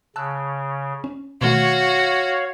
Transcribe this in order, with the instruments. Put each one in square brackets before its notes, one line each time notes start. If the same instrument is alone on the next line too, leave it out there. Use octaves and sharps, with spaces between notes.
[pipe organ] C#3 [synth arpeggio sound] A5 E6 F#6
[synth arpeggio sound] C#4
[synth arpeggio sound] B2 D#3 A3 [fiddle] F#4 [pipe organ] C#5 F5